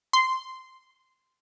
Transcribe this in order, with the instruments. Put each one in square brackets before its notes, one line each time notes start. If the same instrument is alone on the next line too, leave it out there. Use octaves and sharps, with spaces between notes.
[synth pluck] C6